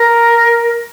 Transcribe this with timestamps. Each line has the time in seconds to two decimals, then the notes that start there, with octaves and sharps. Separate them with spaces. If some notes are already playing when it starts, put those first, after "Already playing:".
Already playing: A#4